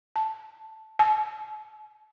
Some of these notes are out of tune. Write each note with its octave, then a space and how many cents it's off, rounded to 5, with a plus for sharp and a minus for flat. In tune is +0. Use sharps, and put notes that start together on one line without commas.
A5 +0
A5 -40